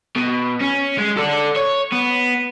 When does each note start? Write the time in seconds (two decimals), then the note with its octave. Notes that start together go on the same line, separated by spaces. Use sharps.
0.16 B2
0.61 C#4
0.98 G#3
1.17 A4 D5
1.56 C#5
1.92 B3